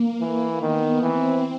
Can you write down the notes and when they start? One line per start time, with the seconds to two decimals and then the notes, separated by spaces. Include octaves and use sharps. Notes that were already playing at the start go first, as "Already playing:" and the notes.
Already playing: A#3
0.21 E3
0.61 D#3 B3
1.02 E3 C4